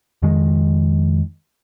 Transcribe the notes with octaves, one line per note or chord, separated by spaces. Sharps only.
F2 D#3 G#3